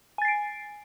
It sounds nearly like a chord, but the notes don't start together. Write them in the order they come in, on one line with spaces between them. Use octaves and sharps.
G#5 A6 C7 D7